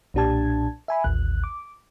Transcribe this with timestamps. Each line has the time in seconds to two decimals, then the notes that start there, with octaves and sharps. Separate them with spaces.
0.14 B1 A#2 D4 G4 A5 G#6
0.88 E5 G#5 B5
1.04 A1 D#2 F#6
1.44 D6